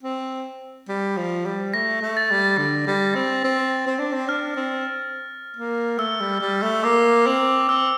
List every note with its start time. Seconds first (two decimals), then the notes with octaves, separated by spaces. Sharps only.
0.03 C4
0.88 G3
1.17 F3
1.46 G3
1.74 A3 A#6
2.02 A3
2.17 A6
2.31 G3
2.58 D3
2.87 G3
3.15 C4
3.44 C4
3.87 C4
3.99 D4
4.12 C4
4.28 D4 F6
4.57 C4
5.57 A#3
5.98 A3 E6
6.21 G3
6.41 G3
6.62 A3
6.84 A#3 D6
7.26 C4
7.69 C4 E6